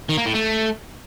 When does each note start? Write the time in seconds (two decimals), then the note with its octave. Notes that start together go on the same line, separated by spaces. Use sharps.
0.09 D#3
0.18 A#3
0.26 A2
0.35 A3